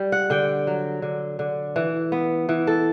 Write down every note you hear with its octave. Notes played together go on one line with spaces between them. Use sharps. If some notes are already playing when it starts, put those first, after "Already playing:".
Already playing: G3
F#5
D3 G5
F#3
D3
D3
E3
B3
E3
A4